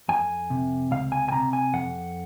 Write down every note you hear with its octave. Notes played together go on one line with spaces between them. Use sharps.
F2 G#5
C3
C#2 F5
G#5
G#5
C3 A#5
G#5
F2 F#5